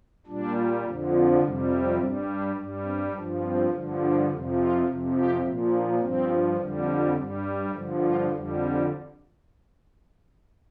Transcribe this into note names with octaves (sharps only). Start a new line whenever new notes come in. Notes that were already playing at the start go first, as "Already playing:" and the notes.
A#2 G3 D4
F2 D3 F3
F4
F2 C3 G3 D4
C4
G2 G3 C4
D4
G2 G3
C4
G2 F3 D4
C4
G2 D3 F3
D4
F2 C3 F3
F4
F2 C3 F3
G4
A#2 F3
D4
G2 F3 C4
F2 D3 G3
D4
G2 G3
G2 D3 F3
F4
F2 D3 G3